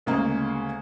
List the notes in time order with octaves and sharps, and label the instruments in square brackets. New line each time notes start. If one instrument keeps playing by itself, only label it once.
[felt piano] D2 C#3 G#3 A#3